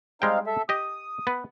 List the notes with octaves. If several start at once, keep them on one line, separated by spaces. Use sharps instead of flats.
G3 G#3 C4 D#4 F5 G5
A4 E5
G4 D#5 D#6
B3 B4